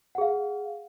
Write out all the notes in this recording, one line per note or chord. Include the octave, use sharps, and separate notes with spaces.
G#4 F5 F#5